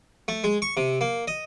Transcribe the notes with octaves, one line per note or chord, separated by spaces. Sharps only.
A3
G#3
C#6
C3
A#3
D#5